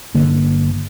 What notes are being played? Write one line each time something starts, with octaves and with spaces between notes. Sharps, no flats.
G1 D3 A#3